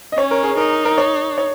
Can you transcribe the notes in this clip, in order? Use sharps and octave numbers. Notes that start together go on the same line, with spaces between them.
D#5
C#4 C#5
A#4
G#4
D#4 A#4
A#4
C#5
C#5